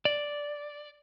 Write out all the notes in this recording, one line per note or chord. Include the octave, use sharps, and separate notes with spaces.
D5